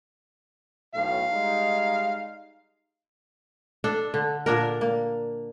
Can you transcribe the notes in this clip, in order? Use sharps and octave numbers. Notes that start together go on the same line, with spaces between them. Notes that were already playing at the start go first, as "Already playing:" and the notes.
B1 A2 F5
G3 G#3 D#4
D4 A4
D3
A#2 D4 A#4
A#3